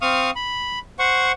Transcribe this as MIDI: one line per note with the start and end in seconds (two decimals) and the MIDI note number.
0.02 0.31 60
0.02 0.31 77
0.02 0.31 85
0.02 0.31 87
0.02 0.31 89
0.36 0.79 83
0.99 1.32 72
0.99 1.32 78
0.99 1.32 85